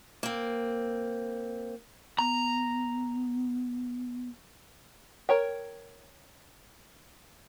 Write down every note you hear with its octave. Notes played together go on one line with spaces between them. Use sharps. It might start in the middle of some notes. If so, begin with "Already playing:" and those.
A#3 C4
B3 A#5
A#4 C#5 G5